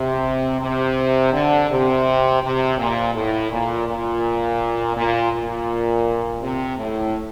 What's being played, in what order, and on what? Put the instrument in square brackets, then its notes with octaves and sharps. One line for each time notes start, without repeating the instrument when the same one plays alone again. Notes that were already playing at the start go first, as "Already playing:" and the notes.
Already playing: [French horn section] C3
C3
D3
C3
C3
A#2
A2
A#2
A#2
A#2
A#2
C3
A2